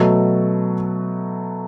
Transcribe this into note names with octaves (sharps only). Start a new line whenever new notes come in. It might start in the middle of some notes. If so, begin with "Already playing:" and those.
Already playing: B2 F#3 A3